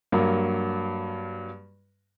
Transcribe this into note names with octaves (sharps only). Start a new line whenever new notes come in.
G2 F#3 A#3